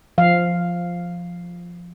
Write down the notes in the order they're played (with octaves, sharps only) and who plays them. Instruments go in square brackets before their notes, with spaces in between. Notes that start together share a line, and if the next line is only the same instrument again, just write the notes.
[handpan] F3 F5